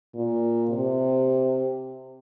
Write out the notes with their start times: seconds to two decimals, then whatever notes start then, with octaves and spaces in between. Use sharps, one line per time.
0.15 A#2
0.69 C3